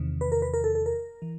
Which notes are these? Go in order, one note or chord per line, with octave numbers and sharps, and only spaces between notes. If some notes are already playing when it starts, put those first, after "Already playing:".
Already playing: E2 C3 D#3
B4
A#4
B4
A#4
A4
A4
A#4
E3